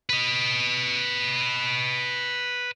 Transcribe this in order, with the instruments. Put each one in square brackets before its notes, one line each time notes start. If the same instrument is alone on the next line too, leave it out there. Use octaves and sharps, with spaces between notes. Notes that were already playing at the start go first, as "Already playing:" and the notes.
[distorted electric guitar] B4 D#5